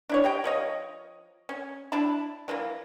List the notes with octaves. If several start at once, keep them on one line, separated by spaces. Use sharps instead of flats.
D4 E4 C#5
G4 D#5 G5
F3 C#5 D#5
C#4
D4 E4 A5 B5
D3 E3 F3 A#3